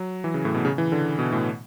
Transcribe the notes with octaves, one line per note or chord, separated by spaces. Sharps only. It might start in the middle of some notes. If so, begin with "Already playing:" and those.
Already playing: F#3
E3
C#3
A2
B2
C#3
E3
D3
B2
A2